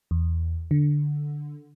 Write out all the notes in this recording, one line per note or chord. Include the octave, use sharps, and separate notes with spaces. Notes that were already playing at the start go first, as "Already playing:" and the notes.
E2
D3